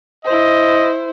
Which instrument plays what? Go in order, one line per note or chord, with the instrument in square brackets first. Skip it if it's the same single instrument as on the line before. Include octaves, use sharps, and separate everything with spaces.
[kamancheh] E4 C5 [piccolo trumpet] D#5